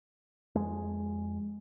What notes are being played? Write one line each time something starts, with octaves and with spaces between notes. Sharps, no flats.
F2 G#3